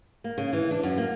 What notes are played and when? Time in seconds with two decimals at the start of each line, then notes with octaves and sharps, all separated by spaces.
0.24 A#3
0.38 C#3
0.53 E3
0.71 D4
0.83 F#2
0.98 A#3